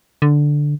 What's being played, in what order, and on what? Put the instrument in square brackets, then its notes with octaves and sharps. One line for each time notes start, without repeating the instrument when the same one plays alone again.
[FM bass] D3